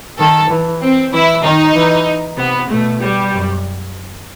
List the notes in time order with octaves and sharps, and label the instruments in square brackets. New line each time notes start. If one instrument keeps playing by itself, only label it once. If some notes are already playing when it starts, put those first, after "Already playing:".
[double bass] D#3 [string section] A4
[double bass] E3
[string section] C4
[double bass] E3 [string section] E4
[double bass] D#3 [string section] D#4
[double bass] E3
[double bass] C3 [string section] B3
[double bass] B2 [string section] A3
[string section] G3
[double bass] F#2